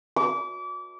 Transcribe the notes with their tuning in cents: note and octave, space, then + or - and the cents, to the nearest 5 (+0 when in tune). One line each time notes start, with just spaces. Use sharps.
D6 -30